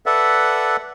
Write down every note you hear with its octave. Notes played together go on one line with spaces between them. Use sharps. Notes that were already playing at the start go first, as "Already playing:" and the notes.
A4 B4 D5 E5 F#5